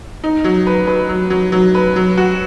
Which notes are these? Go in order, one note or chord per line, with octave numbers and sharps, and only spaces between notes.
D#4
F#3
B4
B4
F#3
F#3
F#3
B4
F#3
F#4